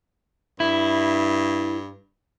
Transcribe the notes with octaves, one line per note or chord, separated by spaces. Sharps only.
G2 E4